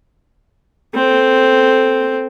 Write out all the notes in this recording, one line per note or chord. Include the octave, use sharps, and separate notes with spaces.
C4 A4